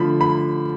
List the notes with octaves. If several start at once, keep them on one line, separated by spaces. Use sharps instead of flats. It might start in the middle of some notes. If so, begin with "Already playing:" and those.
Already playing: D3 F3 A3 B5
B5